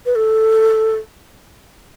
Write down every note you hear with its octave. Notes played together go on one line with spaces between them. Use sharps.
B4
A4